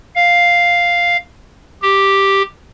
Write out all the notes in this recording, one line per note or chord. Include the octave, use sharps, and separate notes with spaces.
F5
G4